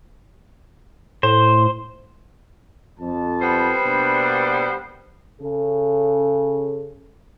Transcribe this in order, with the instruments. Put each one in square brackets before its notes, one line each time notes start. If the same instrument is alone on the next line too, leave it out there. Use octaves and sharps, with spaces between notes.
[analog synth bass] A2 [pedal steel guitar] C5
[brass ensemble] F2 A5
[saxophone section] G3 B3 C5
[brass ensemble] B2 A#3 D4
[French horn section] C#3 A4